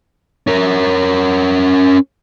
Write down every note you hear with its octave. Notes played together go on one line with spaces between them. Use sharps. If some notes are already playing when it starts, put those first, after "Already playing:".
C#4 A#4